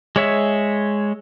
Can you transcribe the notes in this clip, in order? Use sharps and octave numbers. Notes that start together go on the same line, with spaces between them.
G#3 C#5 E5